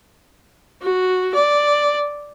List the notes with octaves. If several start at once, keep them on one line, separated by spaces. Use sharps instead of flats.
F#4
D5